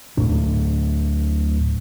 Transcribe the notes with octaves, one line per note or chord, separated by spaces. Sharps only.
D1 D2 A2 D4